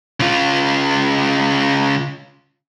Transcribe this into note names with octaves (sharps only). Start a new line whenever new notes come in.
C#3 F4